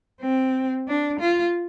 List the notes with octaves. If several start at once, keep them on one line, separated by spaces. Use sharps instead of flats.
C4
D4
F4